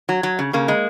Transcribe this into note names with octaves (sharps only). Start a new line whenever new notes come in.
F#3
F#3
C#3
C#3 A#3
G#3